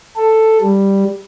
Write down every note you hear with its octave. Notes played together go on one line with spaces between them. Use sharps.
A4
G3